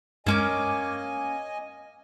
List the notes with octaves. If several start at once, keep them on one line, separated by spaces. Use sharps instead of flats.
G2 G#3 A#3 C#4 D#5 G#5 D6